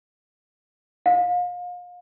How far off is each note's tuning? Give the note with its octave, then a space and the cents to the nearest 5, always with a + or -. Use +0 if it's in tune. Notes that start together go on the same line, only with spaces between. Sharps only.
F5 +35